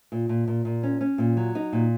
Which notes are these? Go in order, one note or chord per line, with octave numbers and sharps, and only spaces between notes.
A#2
A#2
A#2
A#2
C#4
C#4
A#2
F#3
D#4
A#2